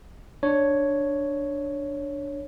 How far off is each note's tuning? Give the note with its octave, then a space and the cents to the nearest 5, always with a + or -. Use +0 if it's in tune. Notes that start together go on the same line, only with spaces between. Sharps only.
D4 +0 C#5 +0